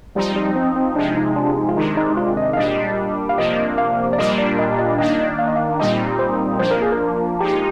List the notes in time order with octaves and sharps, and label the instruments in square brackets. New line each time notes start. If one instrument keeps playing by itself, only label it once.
[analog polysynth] F3 C4 D#4 [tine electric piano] G3
[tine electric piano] G3
C4
C4
[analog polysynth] C3 F3 G#3 [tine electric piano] D4
[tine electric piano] D#4
D4
D#4
F4
[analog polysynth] C3 D#3 G#3 D4 [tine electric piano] D#4
[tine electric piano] D#4
F4
D#5
F5
[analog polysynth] A#2 G3 D4 [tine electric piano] D#5
[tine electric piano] F5
[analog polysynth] C3 F3 A#3 D4 [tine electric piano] D#5
[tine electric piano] F5
D5
[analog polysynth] A#2 G3 A#3 D4 [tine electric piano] D#5
[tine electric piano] D5
D#5
D#5
[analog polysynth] D#3 A#3 D4 [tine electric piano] D#5
[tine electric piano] F5
D#5
F5
[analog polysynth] A#2 G3 C4 D#4 [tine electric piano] D#5
[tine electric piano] C5
[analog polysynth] F3 A#3 D4 [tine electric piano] C5
[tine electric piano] A#4
G#4
A#4
[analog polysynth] F3 G#3 D#4 [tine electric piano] G4